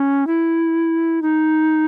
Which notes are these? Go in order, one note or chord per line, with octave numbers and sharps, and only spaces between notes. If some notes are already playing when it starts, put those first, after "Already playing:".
Already playing: C#4
E4
D#4